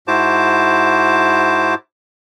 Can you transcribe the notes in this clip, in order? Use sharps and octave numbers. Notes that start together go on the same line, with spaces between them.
G#2 E4 F#4 C5 A5 D6